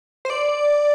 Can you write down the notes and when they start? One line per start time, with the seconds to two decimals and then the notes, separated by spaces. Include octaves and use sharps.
0.25 C5
0.30 D5